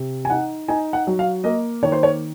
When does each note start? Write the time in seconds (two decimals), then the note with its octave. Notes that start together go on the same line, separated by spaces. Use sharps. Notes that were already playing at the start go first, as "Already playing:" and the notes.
Already playing: C3
0.25 G#5
0.30 D#4 F#5
0.68 D#4 G#5
0.93 F#5
1.07 F#3
1.19 F5
1.44 A#3 D#5
1.82 D#3 C#5
1.92 C5
2.03 C#5